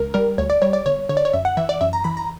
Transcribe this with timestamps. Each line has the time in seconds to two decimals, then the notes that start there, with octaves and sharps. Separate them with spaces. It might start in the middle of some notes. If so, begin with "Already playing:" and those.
Already playing: C#2 A#4
0.14 G3 A#4
0.38 D2 C#5
0.50 D5
0.62 G3 C#5
0.73 D5
0.86 G1 C#5
1.09 D3 C#5
1.17 D5
1.25 C#5
1.33 F#2 E5
1.45 F#5
1.57 E3 E5
1.69 D5
1.81 F#2 E5
1.93 A#5
2.04 E3 B5
2.17 A#5